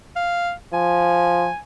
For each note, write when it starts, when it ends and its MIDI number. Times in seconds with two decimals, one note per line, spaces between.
0.16 0.52 77
0.73 1.48 53
0.73 1.58 80